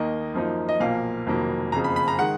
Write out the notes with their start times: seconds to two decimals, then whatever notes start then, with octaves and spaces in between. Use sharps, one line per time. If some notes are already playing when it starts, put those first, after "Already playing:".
Already playing: D#2 D#3 A#3 D#5
0.34 F#2 F3 A#3 D#4
0.69 D#5
0.80 B1 A#2 F3 A#3 F5
1.26 F1 F2 D#3 F#3 A#3
1.72 F#1 F2 C#3 A#5
1.84 B5
1.96 B5
2.08 A#5
2.19 D#3 G#3 F#5